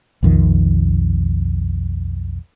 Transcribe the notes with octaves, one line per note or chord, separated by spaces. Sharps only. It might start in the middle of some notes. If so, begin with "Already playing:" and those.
B1 F2 D#3